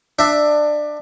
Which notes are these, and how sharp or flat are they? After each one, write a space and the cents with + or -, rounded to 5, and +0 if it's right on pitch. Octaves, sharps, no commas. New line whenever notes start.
D4 +20 E5 +0